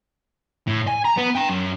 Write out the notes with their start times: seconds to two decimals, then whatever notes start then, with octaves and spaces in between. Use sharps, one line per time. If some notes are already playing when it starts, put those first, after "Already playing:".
0.67 A2
0.87 G#5
1.05 A#5
1.17 B3
1.35 G5 A#5
1.49 F#2